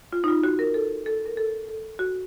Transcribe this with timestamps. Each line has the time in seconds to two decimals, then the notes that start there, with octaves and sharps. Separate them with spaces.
0.12 F4
0.24 D#4
0.28 F4
0.43 F#4
0.59 A#4
0.74 A4
1.06 A4
1.26 A#4
1.37 A4
1.68 A4
1.99 F#4